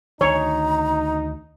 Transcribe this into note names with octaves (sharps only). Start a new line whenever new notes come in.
D2 D#3 D#4 C#5 A#5